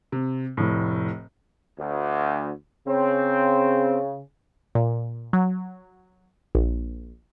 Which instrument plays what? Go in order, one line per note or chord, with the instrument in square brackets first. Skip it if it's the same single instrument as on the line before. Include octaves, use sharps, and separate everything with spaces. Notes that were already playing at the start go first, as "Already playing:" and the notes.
[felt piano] C3
F1 A2
[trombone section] D2
[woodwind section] C#3 [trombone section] C4
[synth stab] A#2
F#3
A#1